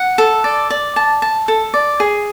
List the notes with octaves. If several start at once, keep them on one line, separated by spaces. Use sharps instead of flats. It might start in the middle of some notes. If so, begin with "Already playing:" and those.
Already playing: F#5
A4
D5
D5
A5
A5
A4
D5
G#4